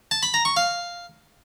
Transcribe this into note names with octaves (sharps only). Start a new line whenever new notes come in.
A5
B5
A#5
C#6
F5